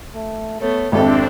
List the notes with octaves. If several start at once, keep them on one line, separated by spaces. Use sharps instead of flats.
A3
A3 B3 C#5
G#1 F2 C4 D4 G4 A4 E5